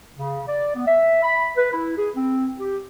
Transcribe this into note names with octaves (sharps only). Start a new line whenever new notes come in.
C#3
D5
B3
E5
B5
B4
E4
G#4
C4
G4